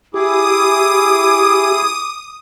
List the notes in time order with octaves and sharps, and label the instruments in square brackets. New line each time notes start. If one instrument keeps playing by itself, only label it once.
[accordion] E4 G#4 [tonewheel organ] G4 [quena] D6 [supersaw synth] D#6